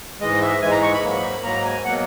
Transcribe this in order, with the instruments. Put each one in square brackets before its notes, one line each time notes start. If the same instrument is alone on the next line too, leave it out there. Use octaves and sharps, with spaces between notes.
[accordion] G#2 E3 G#3 D#5
E5
G#2 E3 G#3 G#5
A#5
C#6
B5
G#2 F#3 A#3
G#2 F#3 A#3 A#5
G#5
B2 F#3 A#3 F#5